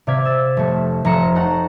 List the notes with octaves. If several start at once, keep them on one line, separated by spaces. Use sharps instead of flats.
C3 D5 F5 G#6 B6
E6 A6
F1 A3
F1 A#5 C#7 E7
D#4 A4 F#5 A#5 C#6